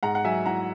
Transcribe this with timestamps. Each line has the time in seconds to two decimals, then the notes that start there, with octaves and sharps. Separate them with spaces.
0.03 G#2 F#5 A#5
0.15 F#5
0.25 F#3 E5 G#5
0.46 E4 F#5 A#5